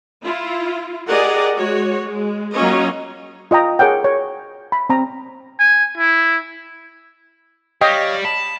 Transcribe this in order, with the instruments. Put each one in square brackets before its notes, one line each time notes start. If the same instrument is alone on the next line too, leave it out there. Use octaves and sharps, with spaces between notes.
[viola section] E4 F4
G4 G#4 A#4 D5 D#5 F#5
G#3 F#4 C#5
G#3
F#3 A#3 C#4 F4 C#5 D#5
[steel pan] F4 D#5 G5 A#5
G#4 A#4 C#5 F#5 G5
C#5
B5
C4 A#5
[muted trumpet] G#5
E4
[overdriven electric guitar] G3 [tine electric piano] C#5 F5 A#6 [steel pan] D#5 G5
[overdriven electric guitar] A5 [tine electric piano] B5